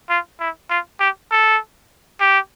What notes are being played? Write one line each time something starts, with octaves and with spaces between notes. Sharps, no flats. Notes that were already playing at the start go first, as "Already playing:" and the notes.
F4
E4
F4
G4
A4
G4